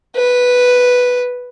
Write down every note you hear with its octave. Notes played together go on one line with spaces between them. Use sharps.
B4